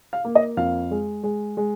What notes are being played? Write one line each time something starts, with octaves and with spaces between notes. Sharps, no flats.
F5
A#3
D#5
F2 F5
G#3
G#3
G#3